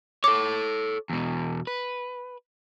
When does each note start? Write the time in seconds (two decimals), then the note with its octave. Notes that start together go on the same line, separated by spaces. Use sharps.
0.24 A4 C#5 D6
1.10 E2 B2
1.67 B4